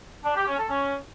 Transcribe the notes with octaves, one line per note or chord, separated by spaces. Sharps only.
D4
G4
C#4
A4
C#4